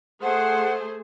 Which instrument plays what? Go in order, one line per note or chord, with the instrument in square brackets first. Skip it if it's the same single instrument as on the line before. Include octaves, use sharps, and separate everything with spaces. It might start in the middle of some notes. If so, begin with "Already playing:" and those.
[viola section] A3 G#4 C5 [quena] F#5